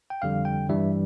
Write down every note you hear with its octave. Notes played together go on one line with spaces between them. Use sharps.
G5
F2 D3 G3 F5
G5
G2 E3 G3 E5